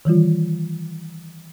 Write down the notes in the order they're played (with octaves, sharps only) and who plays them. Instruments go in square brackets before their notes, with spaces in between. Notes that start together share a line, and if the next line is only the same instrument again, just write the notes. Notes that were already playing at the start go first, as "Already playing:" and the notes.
[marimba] D#3 E3 G3 F4